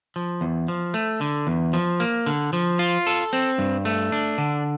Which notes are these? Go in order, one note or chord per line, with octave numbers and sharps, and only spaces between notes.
F3
E2
F3
A3
D3
E2
F3
A#3
D3
F3
F4
A4
C4
G2
A3
D4
D3